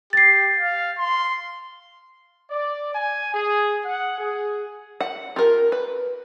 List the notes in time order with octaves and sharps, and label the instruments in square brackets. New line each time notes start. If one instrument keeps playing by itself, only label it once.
[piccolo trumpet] G4 [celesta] A6 C7
[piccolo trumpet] F5
C6
[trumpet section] D5
G#5
G#4
F#5
G#4
[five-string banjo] F#5
F4 G4 A#4
B4